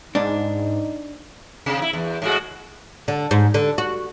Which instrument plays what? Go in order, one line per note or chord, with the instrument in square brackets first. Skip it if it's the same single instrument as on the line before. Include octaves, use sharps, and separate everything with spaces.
[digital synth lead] G#2 [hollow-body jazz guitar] D4 [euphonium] D#4
[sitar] C3
E4
E2
A2 G#3 F#4
[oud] D3
G#2
D3
F#4